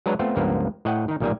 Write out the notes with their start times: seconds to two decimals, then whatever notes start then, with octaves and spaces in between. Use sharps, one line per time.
0.06 F#3 G#3 D4 B4 C#5 A#5
0.19 A3 B3 C4 F4
0.36 C#2 G2 F3 A#3 B3
0.85 A2 C#5 D#5 F#5 G5
1.08 D#3 D#4
1.20 B1 A#2 D#3 G3 A#3 G#5